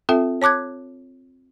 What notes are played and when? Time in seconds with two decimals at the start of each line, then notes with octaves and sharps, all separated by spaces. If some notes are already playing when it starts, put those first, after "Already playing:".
0.09 C4 F4 A4 E5 G5
0.42 C#5 A5 D6 F#6 G#6